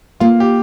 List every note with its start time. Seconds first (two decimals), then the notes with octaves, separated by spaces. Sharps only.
0.20 A#3 F4
0.40 G4